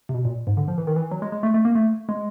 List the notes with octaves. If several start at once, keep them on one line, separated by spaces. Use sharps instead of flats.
C3
B2
A#2
G#2
D3
F3
E3
D#3
E3
F#3
G#3
G#3
A3
A3
A#3
A3
G#3